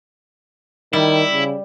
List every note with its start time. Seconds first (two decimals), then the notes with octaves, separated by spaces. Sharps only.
0.93 D#3 G3 E4
1.33 C#3